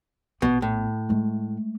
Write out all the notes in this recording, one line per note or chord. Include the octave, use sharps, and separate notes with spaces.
A#1 B2 B3
A2
G#3 A3